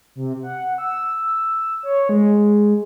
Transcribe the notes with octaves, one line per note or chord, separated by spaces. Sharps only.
C3
F#5
E6
C#5
G#3